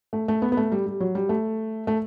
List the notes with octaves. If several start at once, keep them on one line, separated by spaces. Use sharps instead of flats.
A3
A3
B3
B3
A3
G3
G3
F#3
G3
A3
A3